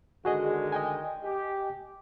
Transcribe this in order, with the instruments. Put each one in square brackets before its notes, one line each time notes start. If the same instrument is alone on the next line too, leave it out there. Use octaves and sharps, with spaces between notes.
[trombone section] D3 D#3 G#3 [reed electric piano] F#4 G#4 D#5
[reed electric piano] D#5 G5 G#5
[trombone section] G4